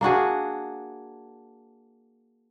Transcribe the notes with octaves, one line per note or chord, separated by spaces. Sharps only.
A#3 D4 F#4 G#4